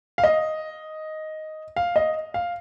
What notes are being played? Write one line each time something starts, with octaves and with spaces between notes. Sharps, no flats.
F5
D#5
F5
D#5
F5